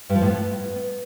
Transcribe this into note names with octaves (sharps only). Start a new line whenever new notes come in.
G2
F3
A2
B3